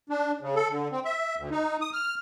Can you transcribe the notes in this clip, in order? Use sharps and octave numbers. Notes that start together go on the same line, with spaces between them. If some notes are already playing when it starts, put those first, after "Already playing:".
D4
C#3
A4
D3
C4
E5
D2
D#4
D#6
F6